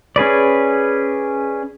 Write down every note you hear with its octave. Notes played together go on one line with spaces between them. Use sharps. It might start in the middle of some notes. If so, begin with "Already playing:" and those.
C#4 G#4 B4 D5